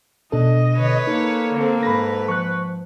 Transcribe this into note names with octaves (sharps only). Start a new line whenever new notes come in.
B2 D4 A4 D#5
D3 B4 C#5
A#3 D#4 A4 C#7
D3 C4
G#2 B4 B5 A#6
F3 C#6 F#6